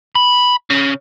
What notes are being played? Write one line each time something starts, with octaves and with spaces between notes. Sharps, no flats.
B5
C#3